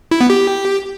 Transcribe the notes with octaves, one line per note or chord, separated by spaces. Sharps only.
E4
B3
G4